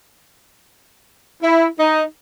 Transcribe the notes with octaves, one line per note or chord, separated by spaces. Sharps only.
E4
D#4